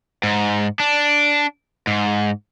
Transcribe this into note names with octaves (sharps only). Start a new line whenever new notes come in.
G#2
D4
G#2